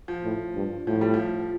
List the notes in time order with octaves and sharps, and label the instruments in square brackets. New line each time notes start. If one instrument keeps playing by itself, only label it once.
[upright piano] F3
[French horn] A2
G2
[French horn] A2 [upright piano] F3
[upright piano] G3
F3